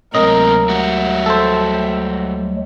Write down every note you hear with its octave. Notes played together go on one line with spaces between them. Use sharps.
D2 C3 F#3 G#3 A#3 C4 A#4 D#5
G3 F#4 E5
A4 C5